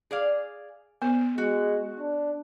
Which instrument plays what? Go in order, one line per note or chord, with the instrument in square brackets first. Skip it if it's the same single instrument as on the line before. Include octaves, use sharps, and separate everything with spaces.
[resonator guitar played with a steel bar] G#4 D5 F5
[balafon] B3 [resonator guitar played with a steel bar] C5
[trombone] G#3 [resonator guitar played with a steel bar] F#4
[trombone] D4